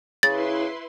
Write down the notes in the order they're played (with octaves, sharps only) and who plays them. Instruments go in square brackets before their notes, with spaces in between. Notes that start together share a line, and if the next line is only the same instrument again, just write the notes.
[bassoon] C#3 [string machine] E4 B4 C6 [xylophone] A6